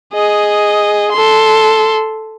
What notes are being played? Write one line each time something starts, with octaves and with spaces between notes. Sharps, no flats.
G#4 D#5
A4 C6